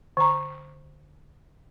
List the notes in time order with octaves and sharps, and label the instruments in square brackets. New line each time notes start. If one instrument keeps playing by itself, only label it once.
[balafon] D3 A#5